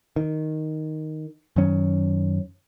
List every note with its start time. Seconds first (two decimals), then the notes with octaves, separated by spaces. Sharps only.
0.16 D#3
1.56 F#2 D#3 C#4